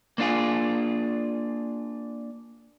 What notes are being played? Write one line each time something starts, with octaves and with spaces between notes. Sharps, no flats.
A#3 D4 F4 G#4